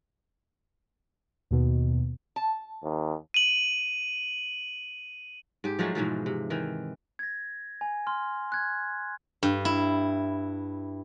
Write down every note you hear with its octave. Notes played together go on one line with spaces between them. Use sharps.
D#2 B2
A5
D#2
D#7 F#7
G#2 G4
F3 F#3 G#3 A3
G#2 B2 E3 F3
C3
D#3 E3
G#6 A#6
G#5
C6 F6
F#6 G#6
G2
E4